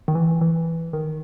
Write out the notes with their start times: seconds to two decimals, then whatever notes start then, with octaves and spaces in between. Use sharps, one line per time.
0.08 D#3
0.15 E3
0.41 E3
0.93 D#3